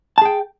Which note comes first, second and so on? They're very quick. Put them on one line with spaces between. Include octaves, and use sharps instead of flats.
A5 G#4 G5